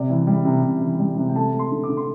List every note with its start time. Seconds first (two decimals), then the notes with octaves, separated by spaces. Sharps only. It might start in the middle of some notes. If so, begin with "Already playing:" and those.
Already playing: C3 D5
0.10 E3
0.27 G3
0.45 C3
0.63 C3
0.81 E3
0.99 G3
1.17 C3
1.29 G5
1.36 A3 A5
1.54 A3
1.59 C6
1.72 D3
1.83 D6
1.89 D3
1.97 C6